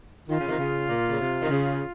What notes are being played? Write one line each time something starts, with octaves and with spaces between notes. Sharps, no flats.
D#3 F4
C#3
C3 D#3
C#3
A#2
C#3
C3
D#3
C#3